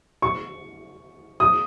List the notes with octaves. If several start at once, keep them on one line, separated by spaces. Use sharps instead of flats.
C#6
D#6